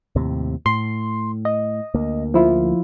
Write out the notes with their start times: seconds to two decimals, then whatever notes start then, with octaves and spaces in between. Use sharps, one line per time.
0.16 D#2 A2 C3
0.66 A2 C6
1.45 D#5
1.94 D2 A#3
2.34 F3 E4 F4